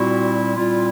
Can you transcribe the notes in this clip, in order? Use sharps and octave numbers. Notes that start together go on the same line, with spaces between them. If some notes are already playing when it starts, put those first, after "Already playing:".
Already playing: A#2 G3 C4 E4 F#4
A#2 G3 C4 E4 F4